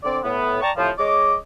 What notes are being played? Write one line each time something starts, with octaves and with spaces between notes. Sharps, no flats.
D3 C4 D5
A2 B3
D5 G5 A5 A#5 C#6
A2 C3 F3
G#3 C#5 D#5 D6